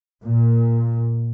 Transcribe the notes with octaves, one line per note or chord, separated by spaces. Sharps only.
A#2